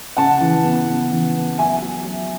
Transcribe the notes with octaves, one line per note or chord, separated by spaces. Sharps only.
C#3 F#5 A5
E3
B3
C#3
E3
B3
F#3 E5 G#5
F#3
F#3